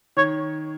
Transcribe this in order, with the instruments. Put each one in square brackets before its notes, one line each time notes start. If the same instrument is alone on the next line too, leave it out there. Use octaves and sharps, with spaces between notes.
[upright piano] D#3 [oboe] C#5